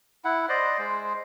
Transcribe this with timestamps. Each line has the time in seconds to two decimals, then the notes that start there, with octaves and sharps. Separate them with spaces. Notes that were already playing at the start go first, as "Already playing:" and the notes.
0.25 E4 F#5
0.49 C5 D5 D#5
0.78 G#3 C5